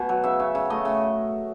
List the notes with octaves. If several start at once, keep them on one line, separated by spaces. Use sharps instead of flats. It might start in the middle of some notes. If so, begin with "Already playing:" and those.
Already playing: B2 G#5
F#3
C#3 E5
C#3
C#3
A3 D#5
C#3